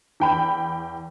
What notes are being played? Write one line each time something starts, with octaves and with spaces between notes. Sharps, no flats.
E2 G5 B5